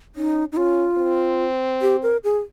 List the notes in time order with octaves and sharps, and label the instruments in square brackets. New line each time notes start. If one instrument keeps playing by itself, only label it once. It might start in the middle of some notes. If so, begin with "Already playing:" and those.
[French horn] C#4 [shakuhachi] D#4
[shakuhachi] D#4
[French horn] C#4 [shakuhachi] F4
[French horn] C4
[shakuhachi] G4
A#4
G#4